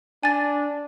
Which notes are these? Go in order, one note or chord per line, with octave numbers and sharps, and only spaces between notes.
D4 G#5 A6